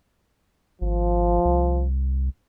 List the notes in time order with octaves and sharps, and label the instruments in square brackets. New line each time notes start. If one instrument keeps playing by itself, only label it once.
[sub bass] G#1 [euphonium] F3
[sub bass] C2